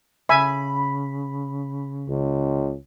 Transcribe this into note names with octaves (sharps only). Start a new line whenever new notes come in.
C#3 E5 G#5 B5
C#2